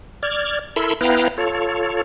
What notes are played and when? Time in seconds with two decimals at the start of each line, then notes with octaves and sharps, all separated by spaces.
0.23 D5 F6 G#6
0.76 E4 A4 A#4 B5 C6 E6
1.01 B3 E4 B4 F5 G5 A#5
1.38 F4 A4 C#5